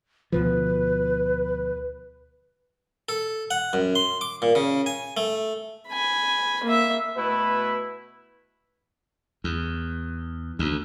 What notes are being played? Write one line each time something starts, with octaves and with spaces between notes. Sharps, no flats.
D2 B2 F3 B4
A4
F#5
F#2
C6
D6
A#2
C#3
G#5
A3
G#5 B5
A#3 E5
B2 A3 E4 B4
E2
D2